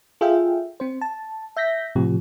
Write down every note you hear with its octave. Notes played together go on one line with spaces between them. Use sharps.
F4 G#4 A4 E5 F5 G5
C4 C5
A5
E5 G6 A#6 B6
A2 C3 F3 G4